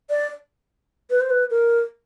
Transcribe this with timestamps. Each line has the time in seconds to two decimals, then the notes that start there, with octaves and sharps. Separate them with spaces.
0.10 D5
1.10 B4
1.21 C5
1.30 B4
1.50 A#4